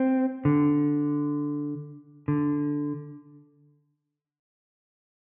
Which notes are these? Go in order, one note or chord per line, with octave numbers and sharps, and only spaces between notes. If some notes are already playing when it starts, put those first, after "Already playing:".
Already playing: C4
D3
D3